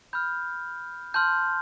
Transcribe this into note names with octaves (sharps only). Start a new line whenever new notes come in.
B5 F6 G6
A5 C6 F6 G6